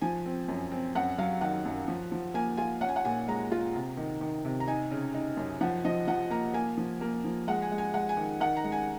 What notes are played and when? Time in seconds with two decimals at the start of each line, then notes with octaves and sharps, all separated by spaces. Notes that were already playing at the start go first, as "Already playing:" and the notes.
0.01 F3 G#5
0.26 C4
0.49 F#2
0.72 C4
0.95 F#2 F#5
1.18 F#3 F5
1.41 D#3 F#5
1.65 F#2
1.88 F3
2.12 F3
2.34 A#3 G#5
2.57 F4 G#5
2.81 C#4 F#5
2.89 G#5
2.96 F#5
3.05 A#2 G#5
3.28 G#3 A#5
3.52 F4
3.75 C3
3.97 D#3
4.21 D#3
4.45 C3
4.60 A#5
4.68 D#4 G#5
4.91 C#3
5.14 D#4
5.37 F#2
5.61 F3 F#5
5.85 F3 D#5
6.07 F3 F#5
6.30 A#3 A#5
6.54 A#3 G#5
6.77 F3
7.01 A#3
7.24 F3
7.48 G#3 F#5
7.62 G#5
7.71 G#3
7.78 G#5
7.94 G#3 F#5
8.09 G#5
8.17 D#3
8.40 D#3 F#5
8.57 A#5
8.64 G#3
8.72 G#5